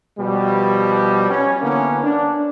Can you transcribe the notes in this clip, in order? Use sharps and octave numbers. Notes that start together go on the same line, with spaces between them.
B2 F3 G3
C#4
D3 E3 A#3 B3 C#4
D4